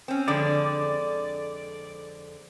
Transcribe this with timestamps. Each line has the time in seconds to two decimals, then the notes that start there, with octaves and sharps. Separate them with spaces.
0.08 C4 C#4
0.28 F2 D3 G#3 D5